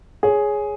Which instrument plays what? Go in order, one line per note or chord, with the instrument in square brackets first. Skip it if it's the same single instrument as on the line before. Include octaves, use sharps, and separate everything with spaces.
[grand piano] G#4 C#5